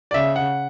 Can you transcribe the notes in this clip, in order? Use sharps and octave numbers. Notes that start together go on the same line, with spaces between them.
D5
C#3 E5
F#5